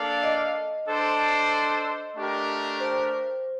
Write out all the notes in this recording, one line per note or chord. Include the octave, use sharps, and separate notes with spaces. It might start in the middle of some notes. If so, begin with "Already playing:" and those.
Already playing: A#3 D4 A4 D5 F5
D#5
D4 A4 C5
A3 D4 G4 A#4
C5